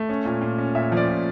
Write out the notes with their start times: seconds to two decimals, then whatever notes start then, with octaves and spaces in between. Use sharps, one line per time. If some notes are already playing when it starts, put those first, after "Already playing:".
Already playing: A3
0.09 C#4
0.25 A#2
0.42 A#2
0.58 C#4
0.75 A#2 E5
0.92 F3 D5
1.08 A#2